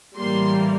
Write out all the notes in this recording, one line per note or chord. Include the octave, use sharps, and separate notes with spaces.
A2 E3 G3 A#3 C6